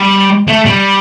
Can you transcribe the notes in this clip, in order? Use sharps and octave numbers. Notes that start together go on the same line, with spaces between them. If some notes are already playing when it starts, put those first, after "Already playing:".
Already playing: G3
A3
G3